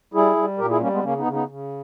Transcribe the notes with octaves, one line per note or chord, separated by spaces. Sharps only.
G3 E4 G#4
G3
A#2 G4 A#4
E4 G#4
G3 A#3 C#4
G#3 B3
C#3 A#3 C#4
B3 D#4
C#3
B3 D#4
C#3